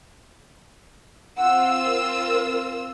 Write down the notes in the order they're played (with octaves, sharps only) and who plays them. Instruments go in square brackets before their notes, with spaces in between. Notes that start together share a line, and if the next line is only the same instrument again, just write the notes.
[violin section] C4 F4 E6 [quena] F#5
[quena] A#4